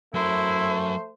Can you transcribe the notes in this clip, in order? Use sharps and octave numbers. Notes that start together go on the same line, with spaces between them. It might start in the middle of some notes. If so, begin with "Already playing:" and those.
F#3 A3 E4 A#4 C5